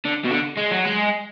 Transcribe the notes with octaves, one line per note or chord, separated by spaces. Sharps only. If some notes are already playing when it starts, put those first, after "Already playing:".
D3
B2
D3
G#3
F#3
G#3